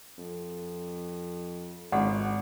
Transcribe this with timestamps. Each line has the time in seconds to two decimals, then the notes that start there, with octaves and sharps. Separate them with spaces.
0.18 F2
1.92 G#1 C#2 F#5